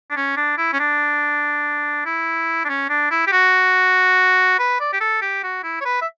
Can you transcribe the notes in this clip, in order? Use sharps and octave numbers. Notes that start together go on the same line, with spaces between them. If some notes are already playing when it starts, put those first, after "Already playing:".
D4
C#4
D4
E4
C#4
D4
E4
D4
C#4
D4
E4
G4
F#4
B4
D5
G4
A4
G4
F#4
E4
C#5
B4
E5